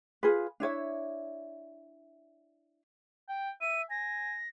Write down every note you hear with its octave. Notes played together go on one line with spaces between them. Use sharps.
F4 G#4 B4
D4 E4 C#5 E5
G5
E5 D#7
G#5 A#6